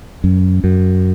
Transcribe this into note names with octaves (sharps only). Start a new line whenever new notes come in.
F#2
F#2